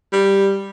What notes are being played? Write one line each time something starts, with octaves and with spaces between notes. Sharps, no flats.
G3